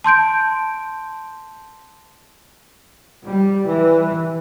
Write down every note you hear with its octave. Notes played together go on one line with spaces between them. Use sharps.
A5 C6 G6 D7
G3
E3